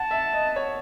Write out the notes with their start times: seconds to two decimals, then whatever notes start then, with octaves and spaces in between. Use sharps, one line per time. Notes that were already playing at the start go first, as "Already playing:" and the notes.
Already playing: F#5 A5
0.11 E5
0.34 D#5
0.56 C#5